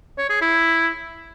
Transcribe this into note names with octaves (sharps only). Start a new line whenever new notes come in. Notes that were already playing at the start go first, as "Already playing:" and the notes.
C#5
G#4
E4